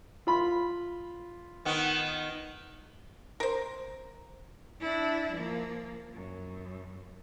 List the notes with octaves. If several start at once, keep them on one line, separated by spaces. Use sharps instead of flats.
F4 B5
D#3 B3
A#4 C5
D4 E4
F3 A#3
F#2